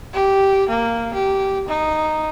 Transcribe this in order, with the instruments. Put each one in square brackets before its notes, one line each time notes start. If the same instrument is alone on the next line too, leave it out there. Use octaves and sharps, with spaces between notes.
[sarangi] G4
A#3
G4
D#4